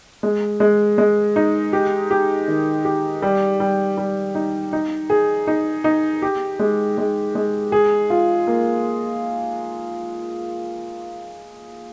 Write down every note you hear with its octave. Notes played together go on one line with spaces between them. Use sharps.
G#3
G#3
G#3
D#4
G4
G4
D#3
G4
G3
G3
G3
D#4
D#4
G#4
D#4
D#4
G4
G#3
G#3
G#3
G#4
F4
A#3